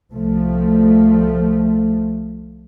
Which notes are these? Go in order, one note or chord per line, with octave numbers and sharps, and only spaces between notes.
C2 F3 A3